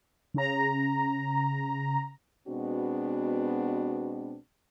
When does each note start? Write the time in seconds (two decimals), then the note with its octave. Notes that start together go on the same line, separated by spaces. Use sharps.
0.34 C#3 A#5
2.48 B2 G#3 B3 C4 D4 F#4